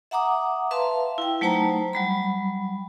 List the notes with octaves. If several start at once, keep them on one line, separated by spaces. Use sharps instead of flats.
E5 F#5 A#5 D6 D#6
B4 E5 F5 A5 C6
E4 G5
F#3 A3 D#4 C5 A5 A#5
F#3 G3 B5